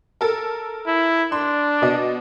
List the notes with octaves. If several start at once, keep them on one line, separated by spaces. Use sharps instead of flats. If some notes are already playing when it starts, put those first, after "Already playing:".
A4 A#4
E4
D4 C6
B2 D#5